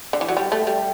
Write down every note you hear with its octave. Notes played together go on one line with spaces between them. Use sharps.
D3
E3
F#3
G3
A3
G3